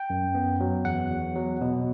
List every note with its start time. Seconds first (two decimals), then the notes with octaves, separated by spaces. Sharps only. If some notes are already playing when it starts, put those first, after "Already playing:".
Already playing: G5
0.10 F#2
0.35 B3
0.60 F#3
0.85 E2 F#5
1.10 E2
1.36 F#3
1.61 B2